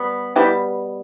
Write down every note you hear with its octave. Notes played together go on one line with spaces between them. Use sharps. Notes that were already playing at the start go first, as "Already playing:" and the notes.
Already playing: G3 B3
B2 G3 B3 E4 G4